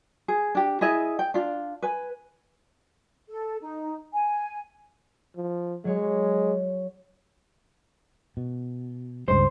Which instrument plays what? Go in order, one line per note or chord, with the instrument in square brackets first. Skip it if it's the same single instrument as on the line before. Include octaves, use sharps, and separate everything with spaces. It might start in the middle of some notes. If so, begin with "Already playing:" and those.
[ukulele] G#4
D4 G4
E4 G#4 D#5 E5
G5
D4 F4
B4 G#5
[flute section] A4
D#4
G#5
[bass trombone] F3
[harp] F#3 C#5 [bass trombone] G#3
[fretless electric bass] B2
[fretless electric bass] C#2 G2 G#3 [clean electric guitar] C5